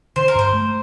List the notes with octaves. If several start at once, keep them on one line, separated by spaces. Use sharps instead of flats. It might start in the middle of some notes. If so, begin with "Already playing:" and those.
D3 C5
A#4
G2 C5
A3